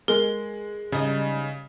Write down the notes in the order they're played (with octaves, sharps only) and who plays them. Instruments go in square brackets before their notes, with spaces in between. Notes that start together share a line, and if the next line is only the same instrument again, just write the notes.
[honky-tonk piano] G#3 [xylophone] A#4
[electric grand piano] C#3 [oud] G3 D#4